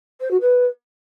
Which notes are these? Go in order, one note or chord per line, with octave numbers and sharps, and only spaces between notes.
C5
F#4
B4